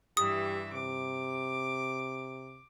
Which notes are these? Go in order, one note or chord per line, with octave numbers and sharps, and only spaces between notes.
G2 E3 G4 E5 D#6
C3 D6